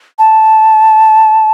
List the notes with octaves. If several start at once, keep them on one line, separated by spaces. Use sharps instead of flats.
A5